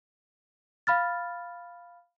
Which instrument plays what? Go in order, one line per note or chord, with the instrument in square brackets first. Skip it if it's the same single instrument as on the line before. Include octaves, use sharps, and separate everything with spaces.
[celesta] F5 B5 F6 A6